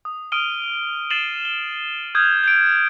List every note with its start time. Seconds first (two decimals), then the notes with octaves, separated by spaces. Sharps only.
0.05 D#6
0.32 D#6 F6 D7 D#7 G7
1.10 A6 C7 D#7 E7 F#7 G7
1.45 G7
2.15 D#6 F6 G6 G#6
2.44 G6 D7